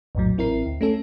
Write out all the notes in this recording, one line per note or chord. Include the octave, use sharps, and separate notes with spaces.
A#1 F2 A2 F#3
A1 C4 E4 A#4 C7
D2
A3 C#4 A4